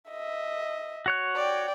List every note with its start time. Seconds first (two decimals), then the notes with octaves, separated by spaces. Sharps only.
0.10 D#5 E5
1.06 F#4 C#5 F#6
1.36 D5 G5